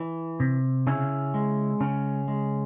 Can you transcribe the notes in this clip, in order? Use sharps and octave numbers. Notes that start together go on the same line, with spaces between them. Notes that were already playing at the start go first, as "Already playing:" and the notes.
Already playing: E3
C3
C#3 C#4 E4
G#3
C#3 C#4
G#3